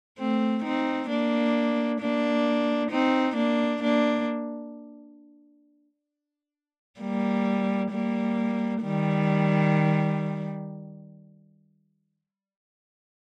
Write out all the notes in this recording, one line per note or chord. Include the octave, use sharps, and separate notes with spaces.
A3 C4
C4 D#4
A#3 D4
A#3 D4
C4 D#4
A#3 D4
A#3 D4
G3 A#3
G3 A#3
D#3 G3